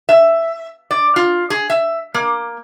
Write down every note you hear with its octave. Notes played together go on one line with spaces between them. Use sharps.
E5
D5
F4
G#4
E5
A#3